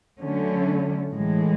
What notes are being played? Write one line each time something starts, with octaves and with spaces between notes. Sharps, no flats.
D3 F#3 A3 C#4
A2 E3 G#3